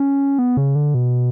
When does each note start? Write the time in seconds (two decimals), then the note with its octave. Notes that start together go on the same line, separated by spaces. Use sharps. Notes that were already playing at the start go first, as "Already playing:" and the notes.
Already playing: C#4
0.39 B3
0.57 C#3
0.75 D3
0.94 B2